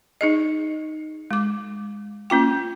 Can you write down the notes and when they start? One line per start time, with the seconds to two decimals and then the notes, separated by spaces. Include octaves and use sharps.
0.21 D#4 G#4 D#5
1.31 G#3 D6
2.30 A#3 C#4 F4 G5